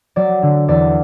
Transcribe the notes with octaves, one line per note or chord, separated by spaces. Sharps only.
F#3 D5
D3
E2 D5